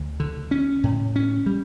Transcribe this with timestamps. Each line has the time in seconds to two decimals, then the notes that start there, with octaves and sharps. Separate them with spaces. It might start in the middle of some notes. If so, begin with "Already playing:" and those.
Already playing: D2
0.20 D3
0.51 C#4
0.84 A2
1.16 C#4
1.46 G3